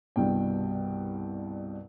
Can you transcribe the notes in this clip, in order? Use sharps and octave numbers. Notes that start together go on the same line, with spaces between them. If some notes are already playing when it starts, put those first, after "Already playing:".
C2 G2 B2 G5